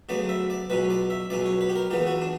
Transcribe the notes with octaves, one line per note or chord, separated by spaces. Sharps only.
D2 C#3 F#3 B3 D5
E5
D5
C#2 B2 F#3 C#4 B4
D5
E5
C#2 B2 F#3 C#4 D5
C#5
B4
G4
A#4
C#2 C#3 E3 B3 G4
F#4
D4